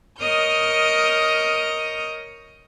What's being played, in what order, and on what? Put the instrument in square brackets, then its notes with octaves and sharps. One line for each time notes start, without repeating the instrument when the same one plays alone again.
[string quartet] A#4 C#5 D#5 D#6 F6 G6